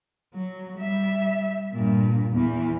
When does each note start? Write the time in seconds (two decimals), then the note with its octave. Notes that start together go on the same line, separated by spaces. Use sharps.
0.34 F#3
0.78 G3 E5
1.73 G2 A#2
2.34 E2 E3